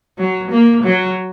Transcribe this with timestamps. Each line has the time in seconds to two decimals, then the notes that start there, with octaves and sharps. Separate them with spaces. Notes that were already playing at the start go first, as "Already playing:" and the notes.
0.18 F#3
0.51 A#3
0.83 F#3